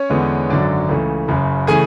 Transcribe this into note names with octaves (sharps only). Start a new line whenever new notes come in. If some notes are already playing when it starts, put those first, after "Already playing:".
Already playing: C#4 C#5
E2 D3 G#3 B3
G#1 F#2 D3 F#3 D4 D5
C#2 C#3 E3 A3
F#1 F#2 C#3
C#3 E3 A3 G#4 G#5